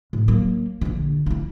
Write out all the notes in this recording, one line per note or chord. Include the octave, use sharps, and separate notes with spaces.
A2
F#3 A#3
A#1 D3
D#4 E4